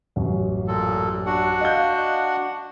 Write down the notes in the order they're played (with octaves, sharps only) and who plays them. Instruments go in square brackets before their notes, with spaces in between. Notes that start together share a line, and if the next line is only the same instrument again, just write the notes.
[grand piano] A1 F#2
[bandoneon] A#2 A4
D4 F#4 F#5
[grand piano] D#5 F5 G6